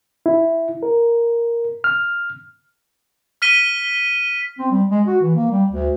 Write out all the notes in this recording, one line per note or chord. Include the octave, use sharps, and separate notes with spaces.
E4
A#4
F6
F6 B6 D#7 G7
C4
G3
G#3
F#4
E3
A#3
G3
D2